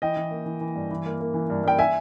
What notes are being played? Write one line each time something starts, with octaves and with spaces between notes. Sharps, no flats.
E3 D#5 G5
E3
A#3
E3
E3
G2
E3
A#3
A#3
E3
G2
G2 G5
E5 G#5